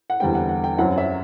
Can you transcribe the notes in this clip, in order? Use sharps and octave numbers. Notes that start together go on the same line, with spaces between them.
F#5
E2 D3 G3 C4 G5
F#5
F#5
G5
F#2 F#3 C4 E4 F#5
E5